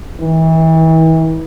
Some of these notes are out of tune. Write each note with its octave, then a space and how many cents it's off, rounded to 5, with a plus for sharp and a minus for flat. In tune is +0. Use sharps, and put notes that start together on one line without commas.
E3 -35